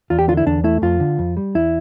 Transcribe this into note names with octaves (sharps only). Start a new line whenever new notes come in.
E2 F4
G4
D3 F4
E4
E2 D4
A3 E4
F2 F4
D3
F2
G3
E2 E4